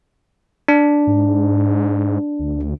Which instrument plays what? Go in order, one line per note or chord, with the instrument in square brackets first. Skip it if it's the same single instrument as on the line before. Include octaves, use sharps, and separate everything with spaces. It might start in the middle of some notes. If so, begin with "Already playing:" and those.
[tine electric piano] D4
[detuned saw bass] G#2
D2